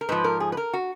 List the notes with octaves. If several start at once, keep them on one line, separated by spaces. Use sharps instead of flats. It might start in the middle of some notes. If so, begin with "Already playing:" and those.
A#4
G#2 F3 B4
A#4
G#4
B4
A#4
F#4